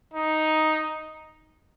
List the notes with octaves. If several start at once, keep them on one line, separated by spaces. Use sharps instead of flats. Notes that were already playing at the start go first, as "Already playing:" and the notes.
D#4